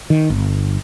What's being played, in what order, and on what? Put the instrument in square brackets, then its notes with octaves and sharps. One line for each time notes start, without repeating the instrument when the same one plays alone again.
[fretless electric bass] D#3
G1